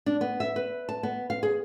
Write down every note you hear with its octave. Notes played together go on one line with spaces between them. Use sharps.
D4
B3
E5
B4
A5
B3
F5
G#4